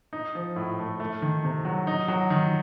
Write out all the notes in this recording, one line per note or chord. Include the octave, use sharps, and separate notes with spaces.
D#4
F3
A2
A3
A3
D#3
C3
F#3
D#4
F#3
D#3